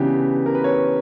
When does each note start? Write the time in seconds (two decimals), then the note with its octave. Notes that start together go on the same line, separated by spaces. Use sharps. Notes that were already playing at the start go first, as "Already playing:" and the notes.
Already playing: C#3 E3 B3 D4 G4
0.46 A#4
0.55 B4
0.64 C#5